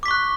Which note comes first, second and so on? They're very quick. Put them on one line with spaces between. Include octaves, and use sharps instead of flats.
D6 B6 C#6 F#6